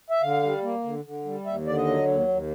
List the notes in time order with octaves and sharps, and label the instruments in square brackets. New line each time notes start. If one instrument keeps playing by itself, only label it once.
[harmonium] E5
D3 F5
G3
A#3
D3
D3
G3
D#2 E5
D3 D5
D#5
F#3
D#2
D#2